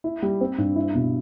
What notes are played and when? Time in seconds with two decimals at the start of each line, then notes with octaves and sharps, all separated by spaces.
0.04 E4
0.22 G3
0.41 C4
0.58 G2
0.76 E4
0.95 B2